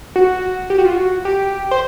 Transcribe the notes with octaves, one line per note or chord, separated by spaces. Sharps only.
F#4
G4
F#4
F4
F#4
G4
C5